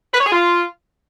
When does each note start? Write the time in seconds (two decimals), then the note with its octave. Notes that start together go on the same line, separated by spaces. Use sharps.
0.13 B4
0.20 C#5
0.26 G#4
0.32 F4